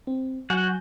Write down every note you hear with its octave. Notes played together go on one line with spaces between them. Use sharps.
C4
F#3 F#4 F#5 G#5 G6